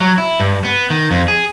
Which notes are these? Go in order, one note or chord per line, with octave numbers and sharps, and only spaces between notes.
F#3
E4
G2
B3
D#3
F2
G#4